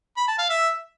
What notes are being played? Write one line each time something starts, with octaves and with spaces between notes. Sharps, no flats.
B5
A5
F5
E5